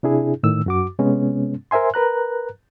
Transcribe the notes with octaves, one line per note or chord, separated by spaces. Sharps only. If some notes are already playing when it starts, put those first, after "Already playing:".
C3 D4 E4 G#4
A2 D#3 E6
F#2 F#4 D6
C3 G#3 B3 C#4
A#4 C5 E5 G#5 C6
A#4 B4 A#5 F#6